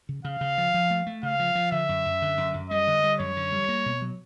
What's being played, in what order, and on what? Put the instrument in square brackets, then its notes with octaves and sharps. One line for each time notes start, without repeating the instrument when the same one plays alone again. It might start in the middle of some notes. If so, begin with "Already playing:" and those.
[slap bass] C#3
[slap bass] C#3 [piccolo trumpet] F5
[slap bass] C#3
F3
F3
A3
A3
[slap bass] C#3 [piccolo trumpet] F5
[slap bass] F3
F3
[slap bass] D3 [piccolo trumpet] E5
[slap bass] F#2
F#2
D3
F#2
F#2
[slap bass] G3 [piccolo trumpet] D#5
[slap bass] D3
G3
[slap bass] F#2 [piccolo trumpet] C#5
[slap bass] D3
G3
A#3
B2
F#3